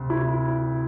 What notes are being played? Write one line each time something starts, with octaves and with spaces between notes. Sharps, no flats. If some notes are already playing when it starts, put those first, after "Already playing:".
Already playing: D2 C3
E4